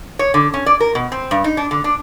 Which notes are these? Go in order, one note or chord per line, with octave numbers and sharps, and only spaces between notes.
C#5
D3
C#4
D5
A#4
B2
C4
G2
D#4
D4
D3
D4